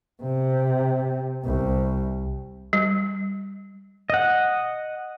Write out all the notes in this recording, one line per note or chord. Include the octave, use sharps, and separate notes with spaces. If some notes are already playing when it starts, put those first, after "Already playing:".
C3
C2
G3
D#5 F#5